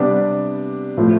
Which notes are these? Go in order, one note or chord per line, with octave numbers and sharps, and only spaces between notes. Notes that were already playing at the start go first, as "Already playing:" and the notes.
Already playing: C3 G3 B3 D4
A2 F3 A3